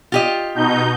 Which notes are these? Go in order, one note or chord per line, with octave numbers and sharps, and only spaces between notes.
F4 G4 D#5
B2 D#4 G6